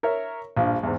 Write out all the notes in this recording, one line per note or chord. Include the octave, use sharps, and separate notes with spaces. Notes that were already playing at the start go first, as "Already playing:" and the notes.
A#4 C#5 E5
A#1 G2 F3
E2 G#2